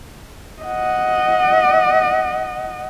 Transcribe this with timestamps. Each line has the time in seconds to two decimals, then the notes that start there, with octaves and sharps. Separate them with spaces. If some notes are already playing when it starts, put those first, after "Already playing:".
0.62 D#5 F#5